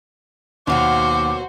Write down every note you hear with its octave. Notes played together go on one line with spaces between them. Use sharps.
D#2 B2 F#3 A#3 F#4 C5 D6